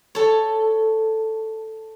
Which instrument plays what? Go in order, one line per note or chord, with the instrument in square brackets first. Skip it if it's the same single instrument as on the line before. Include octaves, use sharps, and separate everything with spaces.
[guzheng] A4 C#5